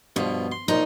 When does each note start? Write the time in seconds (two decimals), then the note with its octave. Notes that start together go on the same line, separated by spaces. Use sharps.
0.16 G2 B2 F3
0.52 C6
0.68 B1 A#2 F3 D#4